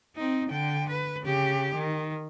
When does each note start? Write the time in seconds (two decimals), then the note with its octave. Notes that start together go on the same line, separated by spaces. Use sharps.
0.16 C4 D#4
0.49 D3 G5
0.89 B4
1.23 C#3 G4
1.75 D#3